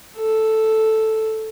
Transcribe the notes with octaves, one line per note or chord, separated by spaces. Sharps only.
A4